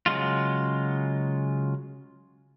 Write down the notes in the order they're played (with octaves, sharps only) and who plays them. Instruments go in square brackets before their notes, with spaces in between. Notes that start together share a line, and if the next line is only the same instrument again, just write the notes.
[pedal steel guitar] C#3 F#3 G#3 F4